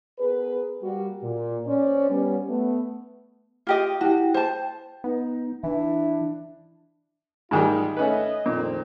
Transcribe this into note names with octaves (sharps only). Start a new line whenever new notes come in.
B3 G#4 A#4 B4
G3 A#3 F#4
A#2
C#4 C5 D5
G3 B3 C#4
A3 B3
F4 G4 D#5
E4 F#4 G4 G5
C5 G5 A5
B3 D#4
E3 D4 E4
G#2 D#3 G3 G#3 D#4 F4
A3 C#4 B4 D#5
F2 A#2 D#3 C4